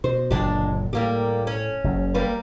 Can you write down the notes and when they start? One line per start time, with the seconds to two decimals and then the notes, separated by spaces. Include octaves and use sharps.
0.04 B2 C5
0.31 F#1 A#2 D3 G#3 D4 G4
0.93 A2 G3 A#3 G4
1.47 C#4
1.84 F#1 F#2 C#3
2.14 G3 A#3 B4